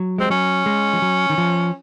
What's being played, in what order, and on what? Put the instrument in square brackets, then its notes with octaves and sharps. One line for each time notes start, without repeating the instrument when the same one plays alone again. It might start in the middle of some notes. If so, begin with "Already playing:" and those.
Already playing: [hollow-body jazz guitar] F#3
[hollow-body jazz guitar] G#3 [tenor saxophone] C4
[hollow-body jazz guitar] F#3 [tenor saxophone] C#4
[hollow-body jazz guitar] G#3
F3
F#3
D#3
F3